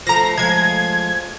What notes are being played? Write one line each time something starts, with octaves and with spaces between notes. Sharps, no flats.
F3 A3 A#5 A#6
F3 G#3 G#6